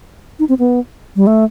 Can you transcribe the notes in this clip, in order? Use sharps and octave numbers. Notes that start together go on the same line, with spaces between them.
D#4
C4
B3
G3
A3